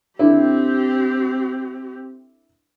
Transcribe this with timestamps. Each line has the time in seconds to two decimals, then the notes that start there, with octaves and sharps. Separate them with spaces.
0.19 D3 C4 E4 G4